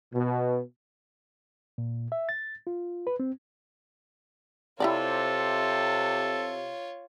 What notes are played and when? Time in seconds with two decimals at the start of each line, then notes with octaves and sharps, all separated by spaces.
0.13 B2
1.78 A#2
2.12 E5
2.29 A6
2.67 F4
3.07 B4
3.20 C4
4.80 C3 E4 F4 G4 A4 C#5 D5